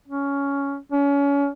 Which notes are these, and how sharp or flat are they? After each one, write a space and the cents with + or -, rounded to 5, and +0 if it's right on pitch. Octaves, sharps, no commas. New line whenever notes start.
C#4 +10
C#4 +30